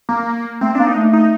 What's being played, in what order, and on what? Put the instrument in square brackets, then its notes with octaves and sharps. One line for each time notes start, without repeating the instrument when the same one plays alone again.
[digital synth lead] A#3
[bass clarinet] A3 [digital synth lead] C4
[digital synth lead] D4
[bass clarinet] A#3
[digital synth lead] D#4
[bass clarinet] A3
[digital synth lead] D#4